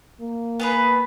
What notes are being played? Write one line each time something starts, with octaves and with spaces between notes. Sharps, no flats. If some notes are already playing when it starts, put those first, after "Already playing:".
A#3
B3 G#4 B4